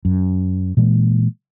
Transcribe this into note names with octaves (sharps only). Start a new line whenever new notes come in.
F#2
A#2 E3 G#3 A#3